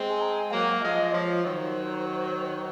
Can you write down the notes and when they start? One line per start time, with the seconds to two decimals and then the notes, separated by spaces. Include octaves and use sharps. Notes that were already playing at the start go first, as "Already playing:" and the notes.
Already playing: G#3 C4
0.10 G#5
0.21 A#5
0.30 G#5
0.51 F#3 A#3 F5
0.72 F5
0.81 F3 G#3 D#5
1.13 F3 C#5
1.44 D#3 F#3 C5